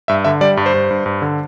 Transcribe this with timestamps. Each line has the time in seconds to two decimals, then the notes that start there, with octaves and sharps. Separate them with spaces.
0.08 G2 E5
0.24 D3 E5
0.41 G3 D5
0.57 G2
0.66 C5
0.74 G2
0.91 G2
1.06 G2
1.22 D3